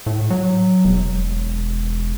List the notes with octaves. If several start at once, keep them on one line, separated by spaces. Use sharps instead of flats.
A2
F#3
E1